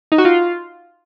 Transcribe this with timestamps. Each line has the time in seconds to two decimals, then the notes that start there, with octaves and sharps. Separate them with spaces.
0.12 D#4
0.18 F#4
0.25 F4